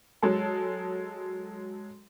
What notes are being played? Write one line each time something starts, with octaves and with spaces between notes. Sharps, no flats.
F#3 G#3 A4